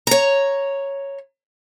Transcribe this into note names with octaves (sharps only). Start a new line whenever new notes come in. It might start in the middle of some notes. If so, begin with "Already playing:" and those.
C#5 A#5